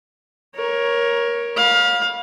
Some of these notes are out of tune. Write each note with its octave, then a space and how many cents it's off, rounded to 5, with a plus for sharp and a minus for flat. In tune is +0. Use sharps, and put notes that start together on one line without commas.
A#4 +20 C#5 +0
F5 +20 B5 -25